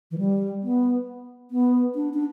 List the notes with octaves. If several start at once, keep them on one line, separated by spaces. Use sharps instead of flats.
E3
G3
B3
B3
D4
D4